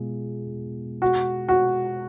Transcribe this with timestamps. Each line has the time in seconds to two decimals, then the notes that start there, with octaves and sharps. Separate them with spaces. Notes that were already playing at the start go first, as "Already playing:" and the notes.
Already playing: B2 G#3 B3 F4 G#4
1.02 F#4
1.49 F#4